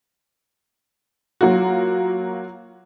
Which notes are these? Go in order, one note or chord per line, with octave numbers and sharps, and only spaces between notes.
F#3 A#3 F4 F#4